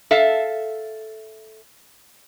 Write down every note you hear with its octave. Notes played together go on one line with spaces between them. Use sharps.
A4 E5 F5